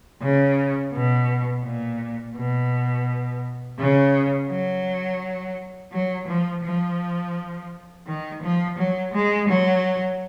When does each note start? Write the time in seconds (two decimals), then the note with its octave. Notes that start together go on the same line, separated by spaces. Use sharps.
0.21 C#3
0.93 B2
1.64 A#2
2.36 B2
3.78 C#3
4.49 F#3
5.92 F#3
6.27 F3
6.63 F3
8.06 D#3
8.42 F3
8.78 F#3
9.13 G#3
9.48 F#3